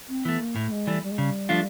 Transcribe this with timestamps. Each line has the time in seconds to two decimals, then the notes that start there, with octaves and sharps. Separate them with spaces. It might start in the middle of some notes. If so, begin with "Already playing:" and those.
0.09 C4
0.25 E3 A3 B3
0.40 A#3
0.56 A2 A3
0.72 G#3
0.87 E3 G3 A3
1.03 G3
1.11 G#3
1.18 C#3 G3
1.49 F3 A3 D4 F4